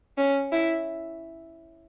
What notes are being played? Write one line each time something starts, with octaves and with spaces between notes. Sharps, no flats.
C#4
E4